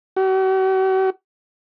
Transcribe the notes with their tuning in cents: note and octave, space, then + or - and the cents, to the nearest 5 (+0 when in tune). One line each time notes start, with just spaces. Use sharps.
F#4 +45